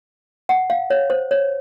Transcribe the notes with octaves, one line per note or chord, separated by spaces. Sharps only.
F#5
F5
C#5
C5
C#5